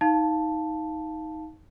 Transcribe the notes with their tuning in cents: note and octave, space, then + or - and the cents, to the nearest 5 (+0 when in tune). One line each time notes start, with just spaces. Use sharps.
D#4 +20 F5 +0 A5 +0